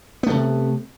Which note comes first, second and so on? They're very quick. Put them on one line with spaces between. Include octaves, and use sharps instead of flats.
B3 A3 C3